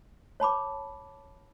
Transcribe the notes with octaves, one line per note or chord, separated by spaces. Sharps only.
C#5 A5 B5 D6